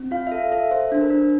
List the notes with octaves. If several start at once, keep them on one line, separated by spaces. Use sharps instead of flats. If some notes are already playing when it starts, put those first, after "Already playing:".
Already playing: C4
F4 F5
E5
A4 F5
A4 E5
A4 C5
D4 C5
A#4
D4